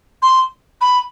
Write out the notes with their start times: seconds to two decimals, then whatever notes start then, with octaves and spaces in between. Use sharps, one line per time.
0.22 C6
0.81 B5